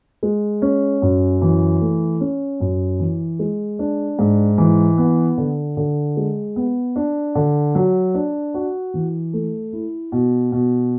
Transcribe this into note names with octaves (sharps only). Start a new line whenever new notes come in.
G#3
C#4
F#2
E3
A3
C#4
F#2
E3
G#3
D4
G#2
E3
B3
D3
D3
G#3
B3
D4
D3
F#3
D4
F#4
E3
A3
E4
B2
B2